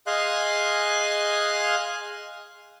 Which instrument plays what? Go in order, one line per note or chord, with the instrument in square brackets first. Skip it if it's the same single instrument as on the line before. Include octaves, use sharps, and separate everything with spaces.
[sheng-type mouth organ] G#4 D#5 F5 G#5 C6 F#6